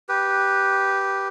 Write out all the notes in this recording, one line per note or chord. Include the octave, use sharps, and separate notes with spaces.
G4 B4